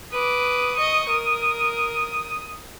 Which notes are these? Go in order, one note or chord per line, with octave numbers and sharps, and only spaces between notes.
B4 D6 D#6
D#5 C#6
A#4